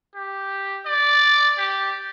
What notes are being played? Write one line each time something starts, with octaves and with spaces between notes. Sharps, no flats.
G4
D5
G4